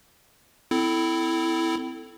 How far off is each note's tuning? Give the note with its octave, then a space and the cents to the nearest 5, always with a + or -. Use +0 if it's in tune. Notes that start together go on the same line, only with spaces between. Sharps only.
C4 -25 E4 +0 A4 +0